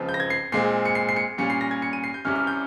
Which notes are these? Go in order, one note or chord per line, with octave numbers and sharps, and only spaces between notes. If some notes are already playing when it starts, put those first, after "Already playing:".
Already playing: C#2 C#3 F3 C4
G6
A#6
G#6
C7
A#2 G#3 C4 C7
C#7
C7
C7
C#7
A#2 G3 C#4 C#7
C7
A#6
G#6
C#7
D#7
C7
G6
C2 C3 G3 C#4 F6
F6
G6